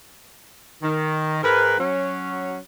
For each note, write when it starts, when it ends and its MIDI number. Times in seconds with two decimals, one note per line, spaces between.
0.83 1.41 51
1.43 1.79 44
1.43 1.79 70
1.43 1.79 71
1.79 2.57 54
1.79 2.57 61